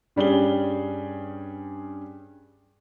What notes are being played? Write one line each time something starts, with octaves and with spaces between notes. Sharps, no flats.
G2 G3 C#4 G#4 G7